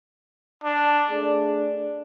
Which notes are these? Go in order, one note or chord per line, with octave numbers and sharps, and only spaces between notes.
D4
A3 D4 G#4 D5